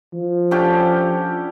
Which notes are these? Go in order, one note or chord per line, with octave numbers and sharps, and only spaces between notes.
F3
D3 C#4 G4